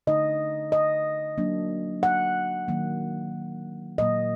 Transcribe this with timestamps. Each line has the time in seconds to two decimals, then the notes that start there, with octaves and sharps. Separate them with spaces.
0.07 D3 A3 D#4 D#5
0.72 D#5
1.38 F#3 A#3 D4
2.03 F#5
2.68 D#3 F#3 A#3
3.98 A#2 F#3 A#3 D#5